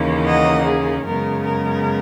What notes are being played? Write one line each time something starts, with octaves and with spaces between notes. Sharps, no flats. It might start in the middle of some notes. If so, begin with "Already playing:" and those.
Already playing: D#2 C#3 E3 A#3 C#4
D#5 F#5
G#4
F#2 C#3 G#3 B3 A#4
A#4